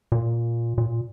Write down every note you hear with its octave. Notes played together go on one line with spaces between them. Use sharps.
A#2
A#2